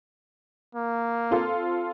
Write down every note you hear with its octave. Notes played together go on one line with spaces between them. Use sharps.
A#3
C4 F4 A4